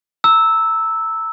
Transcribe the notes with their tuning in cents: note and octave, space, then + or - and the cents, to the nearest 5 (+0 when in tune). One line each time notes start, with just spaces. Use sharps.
A#5 -25 E6 -10